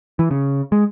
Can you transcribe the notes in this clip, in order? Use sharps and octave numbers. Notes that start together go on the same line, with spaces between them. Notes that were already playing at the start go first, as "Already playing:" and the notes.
E3
C#3
G#3